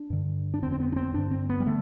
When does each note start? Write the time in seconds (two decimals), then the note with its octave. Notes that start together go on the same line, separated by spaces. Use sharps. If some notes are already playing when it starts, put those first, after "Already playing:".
Already playing: D4
0.10 G2 D3
0.54 D4
0.62 D3 C4
0.66 F2
0.72 C4
0.80 B3
0.92 D4
0.96 C4
1.14 G2 D3 D4
1.31 C4
1.49 B3
1.60 G3
1.66 D3 A3